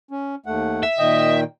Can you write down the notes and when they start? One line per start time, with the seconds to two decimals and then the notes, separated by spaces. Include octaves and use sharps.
0.11 C#4
0.46 D#2 A3 F#5
0.83 E5
0.99 A#2 D#3 D#5 G5